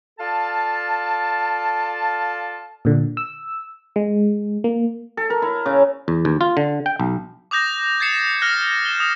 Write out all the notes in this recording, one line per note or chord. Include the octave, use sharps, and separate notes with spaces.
F4 A4 D5 F5 A5
A#2 D3
E6
G#3
A#3
A4
A#4
E4
C#3
E2
D#2
F4
D3
G5
B1
D6 D#6 G6 A#6
G#6 A6 C7 C#7 E7
F6 F#6 A#6
E7 G7
D#6